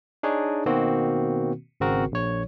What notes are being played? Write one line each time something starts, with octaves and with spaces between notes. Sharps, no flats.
D4 D#4 G#4 C#5
B2 D#3 A#3 C4 F#4
G#1 C#3 C4 F#4 A#4
A#1 C#5